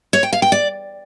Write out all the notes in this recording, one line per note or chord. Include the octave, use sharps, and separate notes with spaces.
C#5
G5
F5
G5
D5